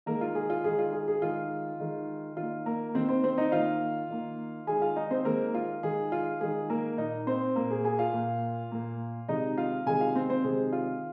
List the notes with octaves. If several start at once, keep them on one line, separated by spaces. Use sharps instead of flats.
D#3 G#3 A#3 A#4
F4
G#4
F4
D#3 G#3 G#4
F4
G#4
G#4
D#3 G#3 F4
D#3 G#3
D#3 A#3 F4
A#3 A#4
D#3 A#3 C4 C5
C4 C5
C4 C5
D#4 D#5
D#3 A#3 F4 F5
D#3 A#3
D#3 G#3 G#4 G#5
F4 F5
D#4 D#5
C4 C5
D#3 G#3 A#3 A#4
F4
D#3 G#3 G#4
F4
D#3 G#3 G#4
A#3 A#4
A#2 A#3 D#4 D#5
C4 C5
A#2 A#3 A#4
G#4
G#4 G#5
F4 F5
A#2 A#3
A#2 A#3
C3 D#3 G#3 D#4 D#5
F4 F5
C3 D#3 G#3 G#4 G#5
F4 F5
C4 C5
C4 C5
C3 D#3 G#3 G#4
F4